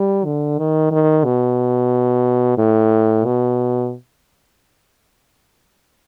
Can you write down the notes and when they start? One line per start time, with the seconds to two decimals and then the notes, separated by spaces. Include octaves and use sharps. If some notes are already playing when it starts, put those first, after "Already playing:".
Already playing: G3
0.25 D3
0.58 D#3
0.91 D#3
1.24 B2
2.58 A2
3.25 B2